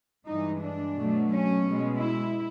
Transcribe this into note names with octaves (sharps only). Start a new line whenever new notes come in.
G2 E3 G#3 D#4
D4
B2 F#3 A3
C#4
B2 G#3
E4